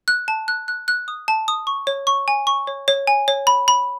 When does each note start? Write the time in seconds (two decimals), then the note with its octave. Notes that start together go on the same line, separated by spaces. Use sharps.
0.08 F#6
0.28 A5
0.48 F#6
0.68 F#6
0.88 F#6
1.08 D#6
1.28 A5
1.48 D#6
1.67 C#6
1.87 C#5
2.07 C#6
2.28 G#5
2.47 C#6
2.67 C#5
2.88 C#5
3.07 G#5
3.28 C#5
3.47 B5
3.68 B5